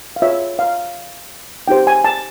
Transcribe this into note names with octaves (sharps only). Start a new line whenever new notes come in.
F5
F4 G#4 C#5 E5
F5
D#4 G4 C5 G5
G#5
A5